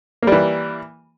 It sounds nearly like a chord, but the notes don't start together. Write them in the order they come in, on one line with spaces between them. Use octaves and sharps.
A#3 G3 E3